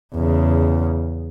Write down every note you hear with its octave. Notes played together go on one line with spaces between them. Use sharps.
E2 C#3